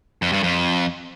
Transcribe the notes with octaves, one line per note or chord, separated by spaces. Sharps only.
F2
G2
F2